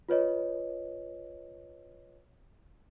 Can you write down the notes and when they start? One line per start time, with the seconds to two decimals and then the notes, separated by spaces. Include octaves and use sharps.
0.09 F4 B4 C#5 D#5